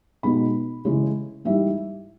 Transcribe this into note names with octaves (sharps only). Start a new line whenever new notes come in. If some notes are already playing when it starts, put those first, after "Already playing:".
B2 G#3 B3 D#4 B5
C#3 E3 G#3 C#4
G#2 E3 G3 E5